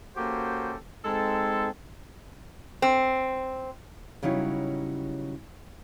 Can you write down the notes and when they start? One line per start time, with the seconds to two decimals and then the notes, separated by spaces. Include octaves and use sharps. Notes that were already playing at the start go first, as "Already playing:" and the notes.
0.16 A#3 C#4 F#4 G4 A4 C5
1.04 G#3 C4 D#4 A4
2.82 C4
4.23 C#3 F#3 G3 D#4 E4 C#5